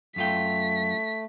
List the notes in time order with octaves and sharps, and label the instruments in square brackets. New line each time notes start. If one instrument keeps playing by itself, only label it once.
[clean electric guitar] F#2 F4 G5 [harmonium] A3 [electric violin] B6